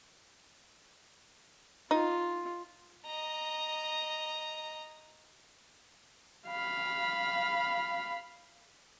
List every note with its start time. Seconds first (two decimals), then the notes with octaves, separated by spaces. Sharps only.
1.91 D#4 F4
3.06 D#5 A#5
6.48 F5 B5